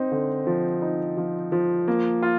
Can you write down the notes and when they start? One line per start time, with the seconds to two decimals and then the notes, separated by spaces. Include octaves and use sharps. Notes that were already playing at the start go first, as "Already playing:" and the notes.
Already playing: C4 D#4
0.11 D3
0.47 F3
0.82 D#4
1.17 F3
1.52 F3
1.88 A#3
2.22 F4